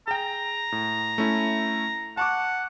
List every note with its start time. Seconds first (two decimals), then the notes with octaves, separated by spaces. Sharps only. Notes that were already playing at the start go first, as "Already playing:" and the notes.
0.08 G#4 G5 A#5
0.72 A2
1.18 A3 C#4 E4
2.17 F#5 A5 C#6 D6